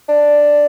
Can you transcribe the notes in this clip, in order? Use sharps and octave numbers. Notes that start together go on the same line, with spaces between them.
D4